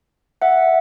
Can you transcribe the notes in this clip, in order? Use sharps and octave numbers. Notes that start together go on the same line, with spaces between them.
E5 F#5